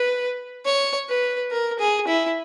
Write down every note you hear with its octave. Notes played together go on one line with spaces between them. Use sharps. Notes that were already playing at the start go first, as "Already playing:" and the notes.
Already playing: B4
C#5
B4
A#4
G#4
E4